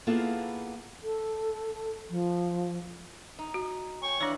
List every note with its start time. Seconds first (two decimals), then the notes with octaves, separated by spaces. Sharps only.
0.07 A#3 B3 E4 F4 G#4 A4
1.03 A4
2.10 F3
3.39 D#4
3.54 F#4
4.03 C#5 G5 G#5 C#6
4.21 E3 D4 C#5 D5 F5 F#5